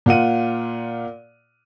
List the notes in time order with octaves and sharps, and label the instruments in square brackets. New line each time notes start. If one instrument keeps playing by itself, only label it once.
[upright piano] A#2 F4 F#5 D#7